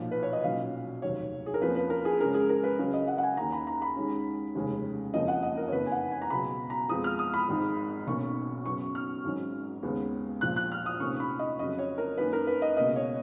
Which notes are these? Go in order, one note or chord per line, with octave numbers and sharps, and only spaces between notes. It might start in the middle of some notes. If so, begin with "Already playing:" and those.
Already playing: B1 A#2 F3
B4
C#5
D#5
B1 A#2 F#3 C#4 F5
F1 D#2 D#3 F#3 C#5
G#4
A#4
F2 F3 A#3 C#4 B4
B4
A#4
G#4
F#2 C#3 G#3 C#4 A#4
G#4
A#4
B4
C#2 C#3 F#3 C#4
D#5
F#5
F#5
G#5
D#2 D#3 A#3 C#4 A#5
B5
A#5
B5
D#2 D#3 G#3 C#4
F1 D#2 C#3 G#3 C#4
F#1 F2 F3 A#3 C#4 D#5
F#5
D#5
A#4
C#5
F#1 F2 D#3 A#3 B4
G#5
F#5
G#5
A#5
C#2 B2 F#3 B3 B5
A#5
F2 F3 G#3 B3 D#6
F6
D#6
B5
G#1 G#2 D#3
B1 B2 A#3 C#4 C#6
F#2 C#3 F#3 B3 C#6
F6
G#1 G#2 F#3 C#4
D#2 C#3 G#3 B3
A#1 A#2 F3 F#6
F#6
F6
D#6
F1 F2 D#3 A#3 C#4 C#6
B5
D#5
F2 C#3 F#3 D#5
C#5
A#4
F#2 D#3 A#3 C#4 B4
A#4
B4
D#5
C#2 B2 A#3 D#5
C#5